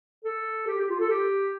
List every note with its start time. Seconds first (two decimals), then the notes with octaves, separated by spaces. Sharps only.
0.25 A4
0.67 G4
0.79 G4
0.89 F4
0.99 A4
1.10 G4